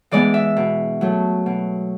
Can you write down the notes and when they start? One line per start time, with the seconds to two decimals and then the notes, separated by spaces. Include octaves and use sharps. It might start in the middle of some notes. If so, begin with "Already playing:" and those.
0.11 E3 G#3 B3 D5
0.34 E5
0.57 B2
1.01 F#3 A3
1.46 B2